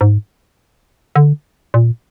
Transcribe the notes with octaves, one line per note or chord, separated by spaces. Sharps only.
G#2
D3
A#2